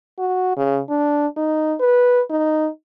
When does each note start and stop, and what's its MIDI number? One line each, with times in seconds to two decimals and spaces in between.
0.19 0.56 66
0.57 0.80 49
0.90 1.27 62
1.37 1.75 63
1.80 2.21 71
2.30 2.69 63